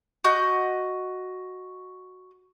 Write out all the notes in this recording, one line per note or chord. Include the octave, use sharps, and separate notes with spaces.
F#4 D#5 G6